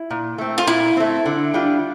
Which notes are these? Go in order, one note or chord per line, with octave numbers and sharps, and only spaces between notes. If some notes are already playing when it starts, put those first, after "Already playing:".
Already playing: E4
A#2
A3 C4
F4
A#2 E4
A3 C4
D3
G3 D4 F4